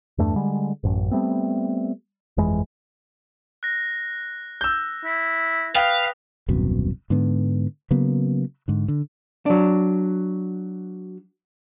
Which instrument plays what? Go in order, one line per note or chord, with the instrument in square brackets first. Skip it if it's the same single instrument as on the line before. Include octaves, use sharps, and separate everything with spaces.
[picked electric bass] E2 G2 A3 D4
D3 G3 G#3
A1 F#2
G3 A3 B3 C4
G1 F2 E3 G#3
[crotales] F#6 A#6
[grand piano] E6 G6
[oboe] E4
[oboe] B4 [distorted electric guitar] F5 [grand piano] G5 [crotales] D#6 F7
[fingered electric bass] D#1 C2 F#2 B2
G#2 D3 B3
C#3 F#3 A#3 B3
G#2 D3
D3
[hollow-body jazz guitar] F#3 D4